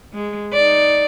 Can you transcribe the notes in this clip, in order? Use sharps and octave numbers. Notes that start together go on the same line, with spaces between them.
G#3
D#4 D5